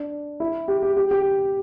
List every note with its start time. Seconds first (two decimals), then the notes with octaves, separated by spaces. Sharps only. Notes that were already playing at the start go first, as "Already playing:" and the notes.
Already playing: D4
0.40 E4
0.68 G4
0.83 G4
0.97 G4
1.11 G4